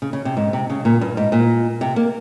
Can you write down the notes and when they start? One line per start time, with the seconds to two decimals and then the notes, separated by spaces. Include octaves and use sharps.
0.02 C#3
0.13 C#3
0.25 C3
0.37 G#2
0.53 C3
0.70 C#3
0.85 A#2
1.01 G2
1.17 G#2
1.32 A#2
1.81 C3
1.96 A#3